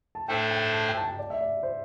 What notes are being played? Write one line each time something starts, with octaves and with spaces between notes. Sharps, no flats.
A5
A2 A3 D4 A4 C5 G5
G5
A5
G5
A5
G5
D5
E5
D5
C5